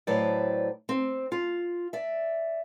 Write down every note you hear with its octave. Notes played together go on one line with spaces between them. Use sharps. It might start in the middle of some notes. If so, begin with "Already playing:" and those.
A2 F#3 B4 C5 D5
C4
F4
D5 E5